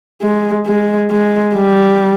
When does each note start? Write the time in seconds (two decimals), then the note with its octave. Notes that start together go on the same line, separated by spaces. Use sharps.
0.22 G#3
0.66 G#3
1.11 G#3
1.55 G3